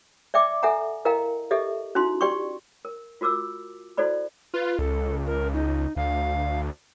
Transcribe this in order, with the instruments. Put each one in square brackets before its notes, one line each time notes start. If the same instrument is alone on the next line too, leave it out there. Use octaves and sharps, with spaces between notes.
[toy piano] D5 E5 G5 D6
A4 E5 F#5 G#5 A#5
E4 A#4 D#5 F5 G5 A#5
G4 A4 D#5 E5
C#4 D#4 E4 F#4 C6
G4 D5 G5 C6 C#6
A#4
F4 F#4 A#4 D6 E6
E4 F#4 A4 C5 D5 B5
[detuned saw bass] F4 [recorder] B4
[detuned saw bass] C#2 [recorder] A4
[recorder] A#4
D#4
[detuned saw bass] D2 [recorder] F5